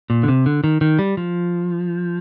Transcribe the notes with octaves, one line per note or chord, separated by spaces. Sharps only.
A#2
D3
C3
D3
D#3
D#3
G3
F3